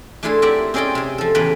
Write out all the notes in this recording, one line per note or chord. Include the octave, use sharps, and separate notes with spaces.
A3 D4 E4 F4 G#4 F5
C4 G4 A#4 D5 E5 F#5
C4 C#4 G#4 D5 D#5 G5
C3 G#4
F3 A4
E2 A2 C#3 B4 G5 A#5